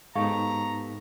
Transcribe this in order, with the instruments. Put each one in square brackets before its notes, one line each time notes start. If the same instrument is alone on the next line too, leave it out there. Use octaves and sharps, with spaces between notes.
[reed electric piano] G#2 D#4 [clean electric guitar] B3 G4 A4 [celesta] F5 C#6 [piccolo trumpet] A#5